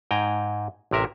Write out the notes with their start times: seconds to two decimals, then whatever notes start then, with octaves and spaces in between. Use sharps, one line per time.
0.11 G#2 G5 G#5 A#5
0.91 A1 C3 A#4 E5